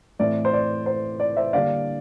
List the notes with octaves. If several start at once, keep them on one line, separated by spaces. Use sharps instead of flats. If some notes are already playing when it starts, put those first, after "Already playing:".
A2 E3 A3 C4 D5
C5
D5
C5
D5
C5 E5
D3 G3 A#3 D4 D5 F5